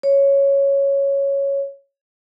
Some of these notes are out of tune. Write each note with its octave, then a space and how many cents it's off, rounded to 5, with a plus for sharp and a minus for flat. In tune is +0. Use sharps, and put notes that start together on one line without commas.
C#5 +0